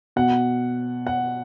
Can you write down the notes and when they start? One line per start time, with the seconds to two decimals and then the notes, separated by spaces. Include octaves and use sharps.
0.16 B2 F#5
1.07 F#5